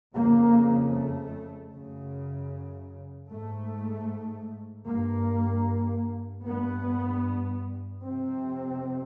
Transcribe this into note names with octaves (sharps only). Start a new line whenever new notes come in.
F2 C#3 A#3
A3
F#2 C#3
G#2 A3
G2 A#3
G2 B3
F2 C3 C4